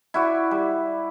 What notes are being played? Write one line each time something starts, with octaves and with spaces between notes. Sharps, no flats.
E4 F#4 D5
G3